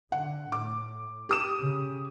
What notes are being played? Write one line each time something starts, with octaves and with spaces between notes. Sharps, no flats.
D3 F#5
A2 D6
G4 D#6 E7
C#3